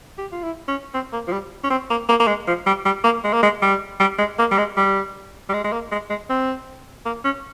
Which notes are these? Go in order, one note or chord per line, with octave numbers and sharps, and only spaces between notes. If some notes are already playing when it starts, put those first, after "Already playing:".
G4
F4
E4
C#4
C4
A#3
F3
G3
C#4
C4
A#3
A#3
A#3
G#3
F3
G3
G3
A#3
G#3
A#3
G#3
G3
G3
G#3
A#3
G3
G#3
G3
G3
G#3
G#3
A#3
G#3
G#3
C4
A#3
C#4